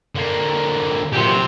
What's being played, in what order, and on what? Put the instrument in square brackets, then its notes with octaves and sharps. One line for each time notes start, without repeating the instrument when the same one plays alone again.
[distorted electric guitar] D3 A#3
[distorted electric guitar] A#2 F#3 [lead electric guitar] G4 C5